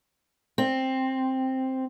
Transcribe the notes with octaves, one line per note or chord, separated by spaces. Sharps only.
C4